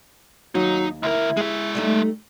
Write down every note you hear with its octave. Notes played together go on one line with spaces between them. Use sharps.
D#2 F#3 D#4
D2 E4 A#4
G#3 G#4 E5
G3 A3 D#4